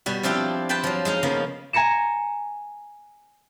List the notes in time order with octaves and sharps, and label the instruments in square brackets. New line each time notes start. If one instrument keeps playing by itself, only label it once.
[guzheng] B2 G3 F#4
F3 C4 D4 E4 F4 G4
B4 C5 G5 A5 B5
F3 F#3
G#3 D#4 F5
C#3 F3 A#3 B3
[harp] G#5 A#5 A#6 C#7 E7